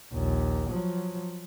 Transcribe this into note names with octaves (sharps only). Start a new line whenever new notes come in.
A#1 D#2
F3 F#3